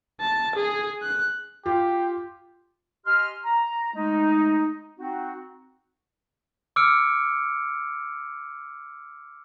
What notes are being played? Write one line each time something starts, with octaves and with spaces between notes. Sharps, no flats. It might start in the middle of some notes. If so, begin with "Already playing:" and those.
A5
G#4
F#6
F4 G4
G4 D#5 G#5 C6 F6
A#5
G#3 A3 D#4
C4 D#4 F#4
D6 E6 F6 C#7 D7